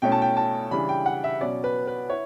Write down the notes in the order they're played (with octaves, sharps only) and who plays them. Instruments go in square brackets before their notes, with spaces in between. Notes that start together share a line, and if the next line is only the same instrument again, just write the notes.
[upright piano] B2 A3 C#4 E4 G5
A5
G5
A5
C#3 E3 G3 D4 B5
G5
F#5
E5
B2 F#3 C#4 D5
B4
B4
E4 C#5